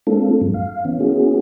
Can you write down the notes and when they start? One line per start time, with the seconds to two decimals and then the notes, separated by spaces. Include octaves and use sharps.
0.07 G#3 A#3 C4 D4 F4 A4
0.41 G2 F#3 G#3
0.54 F5
0.85 E3 B3 C#4
1.00 A#3 B3 C#4 E4 F#4 G#4